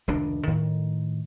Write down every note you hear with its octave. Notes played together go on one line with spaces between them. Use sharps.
F1 C#2 D#3 D4
A2 D#3